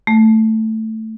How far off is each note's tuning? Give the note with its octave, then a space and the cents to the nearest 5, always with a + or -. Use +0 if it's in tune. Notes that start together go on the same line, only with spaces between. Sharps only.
A3 +5